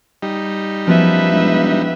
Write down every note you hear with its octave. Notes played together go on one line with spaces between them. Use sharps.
G3 D#4
F#2 F3 B3 B4 E5
E1